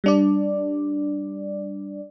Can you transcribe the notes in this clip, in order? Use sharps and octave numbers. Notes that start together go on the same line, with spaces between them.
G3 D4 D5